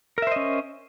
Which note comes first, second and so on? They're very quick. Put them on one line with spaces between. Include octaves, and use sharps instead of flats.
A#4 E5 C5 D#5 C#4